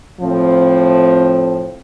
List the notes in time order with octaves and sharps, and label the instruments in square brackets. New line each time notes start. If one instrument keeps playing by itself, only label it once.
[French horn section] A2 F3 C4